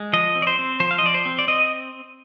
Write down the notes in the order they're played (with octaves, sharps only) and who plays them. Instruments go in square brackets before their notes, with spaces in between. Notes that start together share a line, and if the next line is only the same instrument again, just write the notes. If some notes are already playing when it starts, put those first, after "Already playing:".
Already playing: [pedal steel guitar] G#3
F3 D#5
C4
D5
C5
C4
F3 C5
F5
D#5
F3 D5
C5
C4
D5
C4 D#5